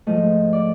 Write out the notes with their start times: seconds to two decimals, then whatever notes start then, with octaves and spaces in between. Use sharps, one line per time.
0.07 G#2 F3 A3 D#5
0.53 D5